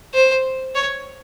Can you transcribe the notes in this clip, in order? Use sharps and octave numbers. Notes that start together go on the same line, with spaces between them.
C5
C#5